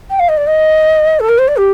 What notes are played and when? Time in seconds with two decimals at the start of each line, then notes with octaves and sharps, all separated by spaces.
0.10 G5
0.19 F5
0.28 D#5
0.37 D5
0.47 D#5
1.20 A4
1.29 A#4
1.38 C5
1.48 D5
1.57 G4